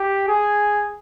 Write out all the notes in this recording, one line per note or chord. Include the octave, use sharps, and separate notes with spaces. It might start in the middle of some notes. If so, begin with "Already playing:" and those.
Already playing: G4
G#4